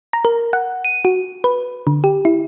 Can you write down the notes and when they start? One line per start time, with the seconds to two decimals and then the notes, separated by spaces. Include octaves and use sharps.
0.13 A#5
0.25 A#4
0.53 F#5
0.85 D#7
1.05 F#4
1.44 B4
1.87 D3
2.04 G4
2.25 E4